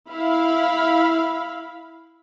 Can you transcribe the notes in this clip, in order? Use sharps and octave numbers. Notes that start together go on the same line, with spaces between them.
E4 F5 B5